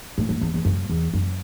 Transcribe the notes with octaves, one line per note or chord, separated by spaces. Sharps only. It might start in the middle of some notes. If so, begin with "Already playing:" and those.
A2
F#2
E2
E2
F#2
E2
F#2